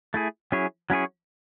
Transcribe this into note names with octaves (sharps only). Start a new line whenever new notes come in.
A3 E4 G#4
F#3 C#4 E4 G#4 C#5
F#3 C#4 E4 G#4 C#5